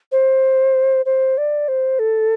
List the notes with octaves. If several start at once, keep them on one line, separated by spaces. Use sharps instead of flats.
C5
C5
D5
C5
A4